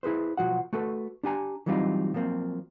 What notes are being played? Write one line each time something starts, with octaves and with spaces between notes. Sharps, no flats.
E4 G#4 B4 C5
B1 C#3 F3 F#4 F#5
A3 F#4 A4 B4
D4 G4 G#5 A#5
E3 F#3 G3 C4 D#4 F4
F3 F#3 A#3 C4